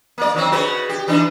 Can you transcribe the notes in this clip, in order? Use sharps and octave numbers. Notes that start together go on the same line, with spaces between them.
A#3 D5
D#3 F#3 C4
C#3 F#4 B4
G4
E3 D4 D#4